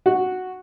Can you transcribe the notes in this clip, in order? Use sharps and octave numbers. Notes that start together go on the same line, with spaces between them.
F#4